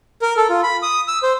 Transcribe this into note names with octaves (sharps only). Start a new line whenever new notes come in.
A#4
A4
F4
B5
D#6
E6
C5